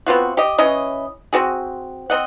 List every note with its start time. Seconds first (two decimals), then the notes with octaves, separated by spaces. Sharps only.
0.07 B3 C4 F4 F#4
0.37 G4 D#5
0.58 E3 C#4 D#5
1.33 C4 F#4 G#4
2.10 C4 D#5 F#5